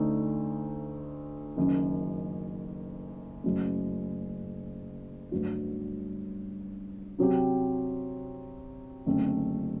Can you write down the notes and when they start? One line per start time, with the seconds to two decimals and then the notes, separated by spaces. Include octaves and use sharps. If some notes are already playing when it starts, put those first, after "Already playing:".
Already playing: D2 D3 A3 D#4 A4
1.57 F#1 F#2 D#3
3.44 F#1 F#2 F#3 A3
5.32 G1 G2 F#3 A3
7.19 C3 F#3 C4 G4
9.06 F#1 F#2 D3 A3 C4